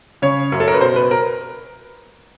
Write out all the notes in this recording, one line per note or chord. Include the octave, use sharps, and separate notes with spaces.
C#3 C#5
F#2
A4
A#4
B4
B2 C5
B4
A#4